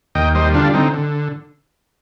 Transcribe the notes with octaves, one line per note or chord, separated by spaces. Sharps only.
D#2 D#5 G5
G3 C5 D#5
D3 D4 F4
D3 C4 D#4
D3